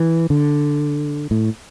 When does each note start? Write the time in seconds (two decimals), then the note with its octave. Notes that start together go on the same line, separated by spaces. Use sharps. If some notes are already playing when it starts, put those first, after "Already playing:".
Already playing: E3
0.30 D3
1.31 A2